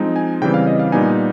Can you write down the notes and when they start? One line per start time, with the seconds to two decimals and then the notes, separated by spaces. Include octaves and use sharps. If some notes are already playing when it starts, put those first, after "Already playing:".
Already playing: F3 G#3 C4 D#4
0.16 G#5
0.42 C#3 E3 G3 C4 G5
0.54 F5
0.67 D#5
0.80 F5
0.92 A#2 G3 B3 D#4 G#5